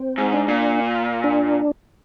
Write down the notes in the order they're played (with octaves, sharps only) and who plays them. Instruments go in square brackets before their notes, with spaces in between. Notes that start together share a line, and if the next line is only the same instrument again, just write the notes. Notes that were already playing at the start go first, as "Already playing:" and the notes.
Already playing: [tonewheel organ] C4
[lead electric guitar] G#2
[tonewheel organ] D4
[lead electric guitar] A#2
[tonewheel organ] D4